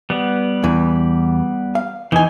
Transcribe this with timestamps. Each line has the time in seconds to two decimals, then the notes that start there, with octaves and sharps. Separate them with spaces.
0.10 G3 B3
0.64 E2 E3
1.75 F5
2.12 E2 E3 D#4 G#5